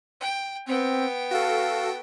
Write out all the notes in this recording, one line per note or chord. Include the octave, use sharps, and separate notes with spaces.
G5
B3 C4 G5
F#4 A4 F5